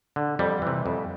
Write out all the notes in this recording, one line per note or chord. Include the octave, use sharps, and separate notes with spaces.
D3
F2 G3
C3 E3
F2